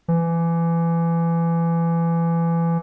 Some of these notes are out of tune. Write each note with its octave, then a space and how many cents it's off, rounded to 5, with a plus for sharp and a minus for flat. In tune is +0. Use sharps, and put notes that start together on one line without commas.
E3 +25